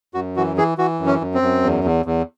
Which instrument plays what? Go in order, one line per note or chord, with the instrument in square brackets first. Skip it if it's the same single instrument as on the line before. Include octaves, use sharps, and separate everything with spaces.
[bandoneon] F#2 F#4
E3 F#4
E3 G#4
E3 F#4
F#2
C#4
F#2
C4
F#2
E2
E2
E2